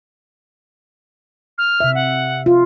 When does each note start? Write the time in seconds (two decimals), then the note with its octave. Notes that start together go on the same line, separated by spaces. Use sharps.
1.58 F6
1.80 C3 E5
1.95 F#5
2.46 F4